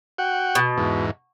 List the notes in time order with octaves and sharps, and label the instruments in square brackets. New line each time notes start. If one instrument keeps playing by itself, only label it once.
[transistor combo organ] F#4 F#5 G5
[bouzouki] B2
[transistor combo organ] E2 G#2